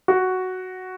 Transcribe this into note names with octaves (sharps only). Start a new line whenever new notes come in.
F#4